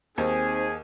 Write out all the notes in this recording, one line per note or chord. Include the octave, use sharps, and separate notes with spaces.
D#2 C4 D#4 G#4 C5